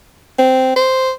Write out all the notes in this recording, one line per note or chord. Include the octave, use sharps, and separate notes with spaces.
C4
C5